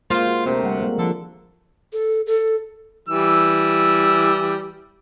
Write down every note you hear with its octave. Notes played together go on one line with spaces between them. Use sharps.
G#3 A#3 F4 C5
F#4
D2 C3 C4 A#4
G3 A3 F#5
G#3 A#3
D3 F3 A4
A4
A4
E3 G3 E6